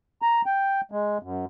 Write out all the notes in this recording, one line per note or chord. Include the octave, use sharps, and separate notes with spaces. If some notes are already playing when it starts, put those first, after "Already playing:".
A#5
G5
G#3
F#2